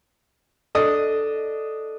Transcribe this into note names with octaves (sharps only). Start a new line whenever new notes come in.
D4 A4 D#5 D#6